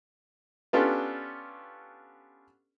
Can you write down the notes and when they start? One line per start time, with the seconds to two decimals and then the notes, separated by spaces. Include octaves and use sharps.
0.73 B3 C#4 D4 F4 G4 A4